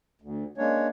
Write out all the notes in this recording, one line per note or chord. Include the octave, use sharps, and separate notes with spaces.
D2
G#3 A#3 C#4 D4 C#5